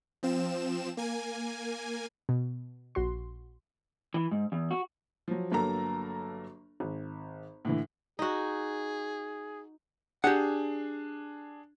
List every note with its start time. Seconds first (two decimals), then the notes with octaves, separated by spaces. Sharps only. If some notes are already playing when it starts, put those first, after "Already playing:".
0.23 F3 C4 E7
0.97 A#3 G#5
2.29 B2
2.95 A#1 F#4 C6
4.14 E3
4.31 G#2
4.52 E2
4.71 F#4
5.28 F3 F#3
5.52 G1 F#3 A#3 A4 A#5
6.80 G#1
7.65 A2 D3 E3
8.19 D#4 F#4 G#4
10.24 D4 G4 G#4 F#5